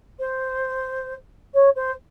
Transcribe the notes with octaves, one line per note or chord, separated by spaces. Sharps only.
C5
C#5
C5